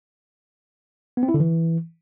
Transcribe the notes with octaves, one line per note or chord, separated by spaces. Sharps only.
B3
C4
E4
D3
E3